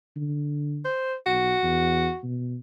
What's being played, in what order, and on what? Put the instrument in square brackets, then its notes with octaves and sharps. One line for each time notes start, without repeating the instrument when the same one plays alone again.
[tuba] D3
[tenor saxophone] C5
[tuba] B1 [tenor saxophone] F#4
[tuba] E2
B2